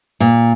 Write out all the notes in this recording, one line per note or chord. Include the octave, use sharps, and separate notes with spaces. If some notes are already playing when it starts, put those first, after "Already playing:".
A#2